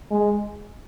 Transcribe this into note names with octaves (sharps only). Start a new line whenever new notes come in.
G#3